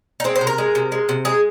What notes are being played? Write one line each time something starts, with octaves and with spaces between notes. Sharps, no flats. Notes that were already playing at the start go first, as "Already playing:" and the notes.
D#4
G#3 C4
C5
C3
A#4
G#3
C3
G#3
C3
G#3 G#4